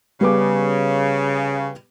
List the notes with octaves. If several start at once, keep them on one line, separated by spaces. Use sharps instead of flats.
C#3 G3 B3 D6